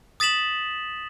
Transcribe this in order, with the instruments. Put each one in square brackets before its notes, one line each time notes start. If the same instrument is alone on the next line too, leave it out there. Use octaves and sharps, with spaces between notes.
[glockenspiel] D#6 A6 B6 E7 F#7